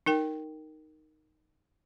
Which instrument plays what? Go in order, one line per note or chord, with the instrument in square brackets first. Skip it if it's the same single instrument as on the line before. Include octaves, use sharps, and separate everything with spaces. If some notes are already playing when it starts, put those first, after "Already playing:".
[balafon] D#4 A#4 G5